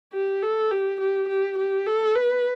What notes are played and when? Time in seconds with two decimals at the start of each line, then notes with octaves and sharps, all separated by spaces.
0.13 G4
0.42 A4
0.71 G4
1.01 G4
1.29 G4
1.58 G4
1.87 A4
2.16 B4